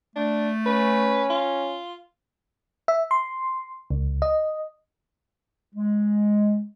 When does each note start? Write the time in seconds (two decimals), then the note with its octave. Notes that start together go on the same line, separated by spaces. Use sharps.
0.16 A3 D4
0.66 C#4 B4
1.30 F4
2.88 E5
3.11 C6
3.90 C#2
4.22 D#5
5.74 G#3